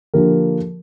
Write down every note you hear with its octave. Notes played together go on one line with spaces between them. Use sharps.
D3 F3 A#3 G4 A#4